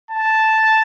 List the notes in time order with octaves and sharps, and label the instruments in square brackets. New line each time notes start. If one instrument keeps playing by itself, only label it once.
[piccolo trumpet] A5